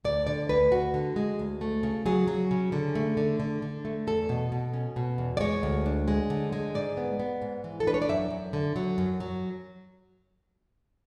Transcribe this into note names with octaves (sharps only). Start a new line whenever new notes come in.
D2 D5
D3 D5
D2 B4
D2 F#4
D3
G#3
D2
A3
C#3
F#3 G#4
F#3
C#3
D3
A3
D3
D3
D3
A3
E2 A4
B2
B2
C#4
B2
E2
D5
G#3 C#5
D2
D4
G#3
D3
G#3
G#2 D5
B3
B3
G#2
E3
A4
D4 B4
C#5
D5
F#2 E5
F#2
D3
F#3
F#2
F#3